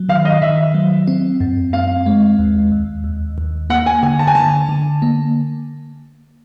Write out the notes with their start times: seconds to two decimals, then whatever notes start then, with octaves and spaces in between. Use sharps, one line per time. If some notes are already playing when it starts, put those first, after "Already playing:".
Already playing: F#3
0.09 D#3 F5
0.25 D#5
0.42 D#3 E5
0.74 F#3
1.07 C4
1.40 F#2
1.73 C4 F5
2.06 G#3
2.39 D#2
2.72 D#2
3.04 D#2
3.38 D#2
3.70 A#3 F#5
3.86 G#5
4.03 D3 G#5
4.19 A5
4.27 G#5
4.35 D3 A5
4.69 D3
5.02 A#3